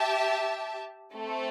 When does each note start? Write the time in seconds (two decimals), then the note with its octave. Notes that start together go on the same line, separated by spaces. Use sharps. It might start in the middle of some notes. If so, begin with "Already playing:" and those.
Already playing: G4 E5 A5
1.14 A3 C4 A4